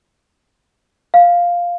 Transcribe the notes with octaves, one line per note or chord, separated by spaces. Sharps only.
F5